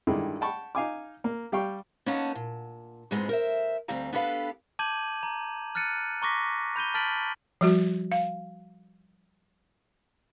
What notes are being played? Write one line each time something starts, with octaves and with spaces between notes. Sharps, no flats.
G2 D3 D#3 G#3 E4
F#5 G5 A5 B5 C#6
D#4 F5 G#5 D6
A#3
G3 G4 F5 G5 C#6
A#3 B3 C#4 D#4 F#5 A5
A#2
F2 G#2 G#3 B3 C4
A#4 C5 E5
D2 G3 C4 F5 A#5
B3 D4 G4 A4 B4 F5
A5 D6 G6 G#6 D#7 F#7
A#5
F6 F#6 A6 C#7 D#7
A#5 C#6 D6 A#6 B6
B5 G6 D#7 G7
A5 F6 A6 B6 D7 F#7
F3 G3 F#4
F5